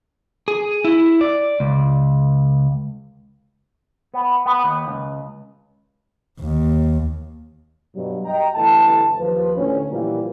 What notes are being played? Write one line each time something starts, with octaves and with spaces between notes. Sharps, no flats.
G#4
E4
D5
C#2
B3
B3
D#2
C#2
D#2
G2 B2 F#3
D#5 G5 A#5
G1 E3 A3 A5
D#2 F3 B4
D2 A2 C#4
A#2 E3 F3 G3 A#3